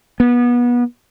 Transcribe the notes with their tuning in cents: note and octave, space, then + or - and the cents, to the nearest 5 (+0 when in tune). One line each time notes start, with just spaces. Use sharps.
B3 -25